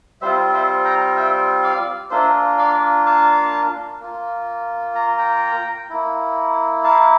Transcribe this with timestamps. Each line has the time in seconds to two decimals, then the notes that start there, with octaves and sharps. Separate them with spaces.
0.21 G3 C4 F4 C5 E5
0.53 C5 E5
0.85 G5 A#5
1.16 E5 G5
1.63 D5 F5
2.11 A#3 D4 F4 C5 E5
2.58 D5 F5
3.06 F5 A5
4.00 A#3 F4
4.95 A#5
5.18 G5 A#5
5.90 A#3 E4
6.84 F5 A5